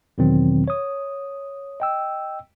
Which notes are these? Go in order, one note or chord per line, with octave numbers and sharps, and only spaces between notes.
E2 B2 D#3 F#3 C4
C#5 D#6
D#5 G5 E6